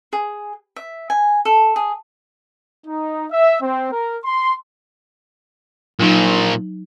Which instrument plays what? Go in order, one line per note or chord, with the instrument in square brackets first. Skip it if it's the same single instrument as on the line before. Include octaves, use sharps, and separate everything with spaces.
[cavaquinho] G#4
E5
G#5
A4
G#4
[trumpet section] D#4
E5
C4
A#4
C6
[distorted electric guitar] A#2 F3 [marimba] F#3 D#4